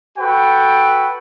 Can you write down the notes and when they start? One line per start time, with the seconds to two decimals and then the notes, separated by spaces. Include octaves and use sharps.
0.18 F#4 A4 B4 G5